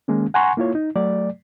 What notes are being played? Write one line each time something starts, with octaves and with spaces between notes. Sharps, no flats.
D#3 G#3 A#3 C#4
F#5 G#5 A#5 C6 C#6
A#3 E4 F4 C#5
D#4
F#3 A3 D5